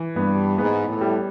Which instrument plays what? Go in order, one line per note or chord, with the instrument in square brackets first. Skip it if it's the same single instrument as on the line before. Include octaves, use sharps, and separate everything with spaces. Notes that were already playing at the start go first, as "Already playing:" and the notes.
Already playing: [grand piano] E3
[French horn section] G2 [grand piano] B3
[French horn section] G#2 [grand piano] B3
[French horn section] A2
[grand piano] G3